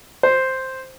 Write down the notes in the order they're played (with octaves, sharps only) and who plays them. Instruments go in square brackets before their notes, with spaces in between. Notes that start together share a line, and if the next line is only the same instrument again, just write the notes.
[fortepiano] C5